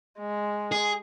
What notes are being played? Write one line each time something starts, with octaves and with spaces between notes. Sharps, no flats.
G#3
G#4